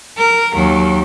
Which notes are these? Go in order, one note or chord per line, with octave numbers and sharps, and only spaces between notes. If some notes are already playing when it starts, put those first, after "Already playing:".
A#4
D#2 F#3